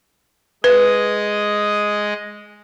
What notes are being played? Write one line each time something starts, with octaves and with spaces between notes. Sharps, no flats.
G#3 B4 D#5